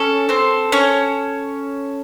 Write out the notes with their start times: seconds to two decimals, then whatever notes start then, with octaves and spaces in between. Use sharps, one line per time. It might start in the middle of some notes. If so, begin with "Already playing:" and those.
Already playing: C#4 A4
0.29 C4 C5
0.72 C#4 C#5